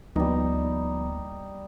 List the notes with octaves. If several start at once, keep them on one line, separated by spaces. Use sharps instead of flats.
D2 F3 G3 A#3 B3 D#4